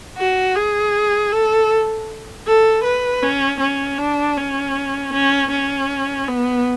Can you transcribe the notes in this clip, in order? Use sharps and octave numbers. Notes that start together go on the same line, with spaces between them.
F#4
G#4
A4
A4
B4
C#4
C#4
D4
C#4
C#4
C#4
B3